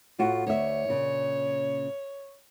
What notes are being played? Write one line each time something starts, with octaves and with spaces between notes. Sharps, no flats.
A2 F4 F#4
D2 C#5 E5
A#2 C#3